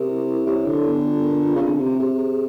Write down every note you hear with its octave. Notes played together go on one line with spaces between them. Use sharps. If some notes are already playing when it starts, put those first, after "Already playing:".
Already playing: C3 A#4
E4
E4
C3 C#5
D3 A4
B3
F4
A#4
F4
C#3
D3 C4
C3 C4
C3 G#4
G#4